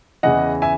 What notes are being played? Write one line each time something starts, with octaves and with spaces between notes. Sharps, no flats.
E2 C#3 E3 D#5 F#5
E5 G#5